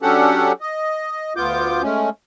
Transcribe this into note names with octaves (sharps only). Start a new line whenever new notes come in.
F#3 C#4 D4 G4 A4 F#5
D#5
D2 B3 F4 D6 G6
G#3 A3 C#4